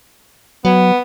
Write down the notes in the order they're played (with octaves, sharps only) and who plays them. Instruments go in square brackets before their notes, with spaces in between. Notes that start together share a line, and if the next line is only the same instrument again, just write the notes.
[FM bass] F#3 [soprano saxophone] B3